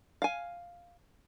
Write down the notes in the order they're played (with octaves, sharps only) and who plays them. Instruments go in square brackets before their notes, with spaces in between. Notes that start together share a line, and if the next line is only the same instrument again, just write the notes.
[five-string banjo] F5 G#5